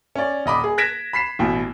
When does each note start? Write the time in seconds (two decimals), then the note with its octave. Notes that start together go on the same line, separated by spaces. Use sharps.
0.15 C#4 D5
0.46 D#1 D#5 B5 D6
0.64 G#4
0.78 F#6 G#6 A#6 B6 D7 E7
1.13 B5 B6 C7 E7
1.39 A1 B2 G5